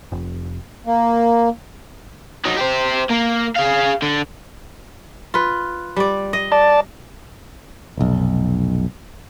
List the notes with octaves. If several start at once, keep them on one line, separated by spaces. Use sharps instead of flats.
F1
A#3
F#3 D#4
G4 C5
A#3
G#4 F5
D3
F4 B4
G3 D5
D#5
D5 A5
F1 B1